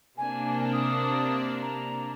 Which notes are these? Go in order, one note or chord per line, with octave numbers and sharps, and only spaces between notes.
C3 A#3 D4 G#5
D#6
A#5